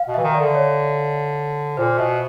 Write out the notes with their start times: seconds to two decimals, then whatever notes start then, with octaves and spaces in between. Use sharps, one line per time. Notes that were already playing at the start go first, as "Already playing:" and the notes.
Already playing: F5
0.08 B2
0.14 E3 E5
0.24 D#3
0.34 D5
0.40 D3
0.55 C#5
1.77 A#2 C5
1.98 B2 E5